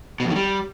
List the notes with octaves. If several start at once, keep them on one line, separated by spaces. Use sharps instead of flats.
B2
F2
D#3
G3